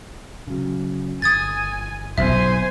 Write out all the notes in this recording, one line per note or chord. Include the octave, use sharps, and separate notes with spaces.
C#3 F#3
G1 G#5 D#6 G#6 A6
B1 C5 E5 G#5